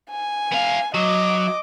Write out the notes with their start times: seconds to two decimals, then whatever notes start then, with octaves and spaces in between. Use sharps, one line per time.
0.11 G#5
0.52 B3 F5
0.95 F#3 D#5 D6